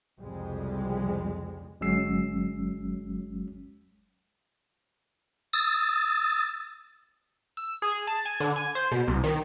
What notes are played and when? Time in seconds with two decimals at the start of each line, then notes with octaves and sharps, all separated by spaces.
0.20 C2 F2 C#3 G3 G#3
1.81 G1 F#3 G#3 C#4 E6 C7
5.53 D#6 E6 A6
7.57 E6
7.82 G#4
8.07 A5
8.25 G#5
8.40 D3
8.56 G#5
8.75 C5
8.91 B2
9.08 C2
9.24 D#3